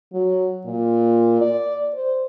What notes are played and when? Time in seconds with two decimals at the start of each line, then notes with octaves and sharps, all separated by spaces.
0.13 F#3
0.66 A#2
1.41 D5
1.94 C5